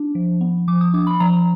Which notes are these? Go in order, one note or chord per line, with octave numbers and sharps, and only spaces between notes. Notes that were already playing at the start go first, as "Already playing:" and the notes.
Already playing: D4
F3
B3
F3 D6
D#6
D4 D6
B5
F3 A#5